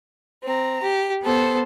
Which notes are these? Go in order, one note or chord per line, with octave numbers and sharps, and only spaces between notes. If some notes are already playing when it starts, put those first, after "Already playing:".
C4 A#5
G4
B3 A4 C5